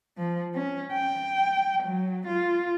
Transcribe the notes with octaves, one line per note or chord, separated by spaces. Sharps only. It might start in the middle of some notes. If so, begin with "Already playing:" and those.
F3
C#4
G5
F#3
F4